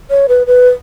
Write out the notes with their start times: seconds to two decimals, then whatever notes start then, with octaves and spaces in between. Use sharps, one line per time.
0.10 C#5
0.29 B4
0.47 B4